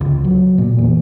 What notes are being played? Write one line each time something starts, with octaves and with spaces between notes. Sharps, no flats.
C#2
F#3
A#2
E2